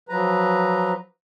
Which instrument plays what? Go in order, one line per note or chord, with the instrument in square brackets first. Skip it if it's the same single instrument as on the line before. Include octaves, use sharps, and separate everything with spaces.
[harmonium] F3 F#3 B4 A#5